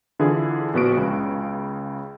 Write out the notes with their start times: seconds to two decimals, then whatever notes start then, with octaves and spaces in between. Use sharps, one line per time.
0.19 D3 E3 E4 F4 G#4
0.74 A#1 B3 F#4 D7
0.97 C#2 C#3